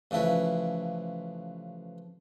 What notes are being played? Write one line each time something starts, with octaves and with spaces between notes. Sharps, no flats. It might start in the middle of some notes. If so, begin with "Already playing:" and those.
A1 C#3 F3 E4 B4